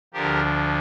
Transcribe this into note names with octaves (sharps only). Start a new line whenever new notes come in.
D2 D3 F3 G4 A#4